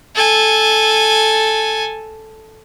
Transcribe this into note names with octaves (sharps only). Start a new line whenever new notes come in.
A4 G#5